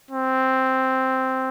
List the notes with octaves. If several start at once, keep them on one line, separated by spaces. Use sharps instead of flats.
C4